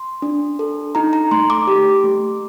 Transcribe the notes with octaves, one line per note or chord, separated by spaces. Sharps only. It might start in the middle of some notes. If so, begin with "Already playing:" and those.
Already playing: C6
D4
A4
D#4 A#5
A#5
A3 C6
D6
G4
A3